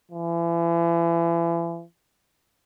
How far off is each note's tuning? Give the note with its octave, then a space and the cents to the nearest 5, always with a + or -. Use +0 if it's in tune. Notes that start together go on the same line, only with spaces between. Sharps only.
E3 +40